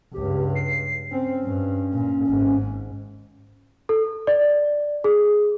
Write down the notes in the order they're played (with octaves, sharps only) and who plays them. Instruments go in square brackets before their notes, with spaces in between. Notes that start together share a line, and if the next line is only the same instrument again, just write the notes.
[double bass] C#2 G2 [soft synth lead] G4
[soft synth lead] C7
[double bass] C4 [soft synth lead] C#4
[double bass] G2
A#2
G#1 G#2
[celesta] A4
D5
G#4